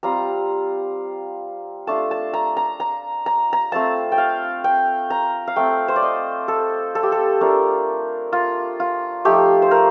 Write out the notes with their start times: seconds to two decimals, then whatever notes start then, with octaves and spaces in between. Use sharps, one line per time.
0.03 G3 C4 F4 A#5
1.87 A3 D4 F4 A5
2.11 A5
2.34 A#5
2.57 A#5
2.80 A#5
3.26 A#5
3.53 A#5
3.72 A3 C4 F4 A5
4.12 G5
4.18 F5
4.64 G5
5.10 A#5
5.47 F5
5.56 A3 C4 F4 G5
5.88 C5
5.96 D5
6.02 D#5
6.48 A4
6.95 A4
7.03 G4
7.12 A4
7.41 A3 D4 F4 A#4
8.32 F4
8.80 F4
9.25 F3 A3 D#4 G4
9.62 C5
9.71 A#4